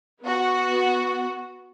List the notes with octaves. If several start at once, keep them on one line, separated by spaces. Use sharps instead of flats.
B3 F#4